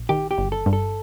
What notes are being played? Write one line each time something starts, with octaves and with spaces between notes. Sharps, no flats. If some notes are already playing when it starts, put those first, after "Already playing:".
Already playing: A#1
D#3 G4
G4
G1
A4
G2
A4